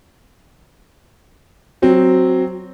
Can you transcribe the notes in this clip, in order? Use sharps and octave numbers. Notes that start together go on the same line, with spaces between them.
F#3 C4